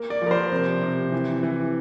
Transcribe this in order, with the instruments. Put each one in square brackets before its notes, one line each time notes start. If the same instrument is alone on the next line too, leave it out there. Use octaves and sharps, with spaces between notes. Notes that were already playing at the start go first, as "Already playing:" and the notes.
Already playing: [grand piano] A#3
D5
F3 A#4
C5
C3
C3
E3
E3